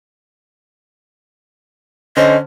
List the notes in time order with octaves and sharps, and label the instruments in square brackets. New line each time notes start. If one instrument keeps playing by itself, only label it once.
[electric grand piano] D3 C#4 C5 [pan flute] D#5